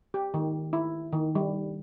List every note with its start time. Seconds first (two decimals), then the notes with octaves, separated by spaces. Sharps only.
0.14 G4
0.34 D#3
0.73 E4
1.12 D#3
1.35 G3